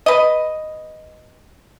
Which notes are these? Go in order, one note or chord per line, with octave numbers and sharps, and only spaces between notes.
B4 D#5